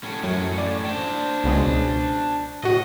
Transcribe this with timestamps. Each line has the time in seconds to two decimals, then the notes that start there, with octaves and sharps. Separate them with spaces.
0.04 A2 C#4
0.23 F#2 A2 C#4
0.58 D5
0.85 D4 C5
1.44 C#2 B2 G#3
2.63 A2 F#4 D#5